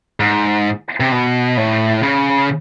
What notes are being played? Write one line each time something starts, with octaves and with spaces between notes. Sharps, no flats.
G#2
C3
B2
A2
C#3